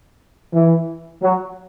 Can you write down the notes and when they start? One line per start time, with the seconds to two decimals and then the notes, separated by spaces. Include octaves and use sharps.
0.54 E3
1.23 F#3